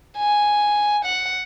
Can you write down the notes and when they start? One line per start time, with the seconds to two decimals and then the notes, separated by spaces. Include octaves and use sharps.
0.18 G#5
1.05 F#5